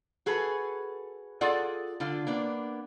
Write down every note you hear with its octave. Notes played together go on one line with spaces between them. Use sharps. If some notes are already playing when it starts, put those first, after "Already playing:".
F#4 G#4 A4 B4
F4 G#4 A4 D5 F#5
D3 F4 A4
A#3 B3 D4